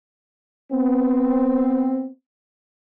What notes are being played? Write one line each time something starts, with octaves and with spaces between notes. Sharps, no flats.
B3 C4